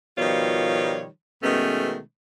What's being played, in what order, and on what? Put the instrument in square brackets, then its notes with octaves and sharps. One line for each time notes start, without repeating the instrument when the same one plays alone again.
[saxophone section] B2 D#3 F3 G3 F4 C#5
B2 D#3 G#3 A3 B3 C#4